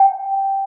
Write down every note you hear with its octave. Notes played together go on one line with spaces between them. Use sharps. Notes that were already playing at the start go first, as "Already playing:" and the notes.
Already playing: G5